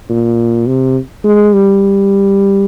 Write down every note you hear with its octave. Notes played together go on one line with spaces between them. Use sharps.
A#2
C3
G#3
G3